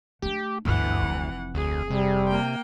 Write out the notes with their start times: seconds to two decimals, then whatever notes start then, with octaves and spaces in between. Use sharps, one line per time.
0.22 A3 D4 G4
0.65 G1 D2 G2 E3 F#5
1.02 F1 C4
1.54 D2 G#4
1.90 C3 G3
2.29 A#3 G5